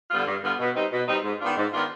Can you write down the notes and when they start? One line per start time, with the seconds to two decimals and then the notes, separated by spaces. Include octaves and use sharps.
0.11 D3 G3 B3 F4
0.26 G2
0.42 D3 G3 B3 F4
0.59 B2
0.74 G3 C4 D#4
0.91 B2
1.07 G3 C4 D#4
1.23 G#2
1.39 D#3 B3 D4 F4
1.56 G#2
1.71 D#3 B3 D4 F4